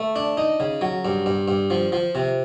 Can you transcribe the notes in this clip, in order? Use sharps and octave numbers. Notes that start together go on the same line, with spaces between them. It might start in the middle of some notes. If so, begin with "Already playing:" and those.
Already playing: A3
D4
D#4
C#3
F#3
G2
G2
G2
F3
F3
C3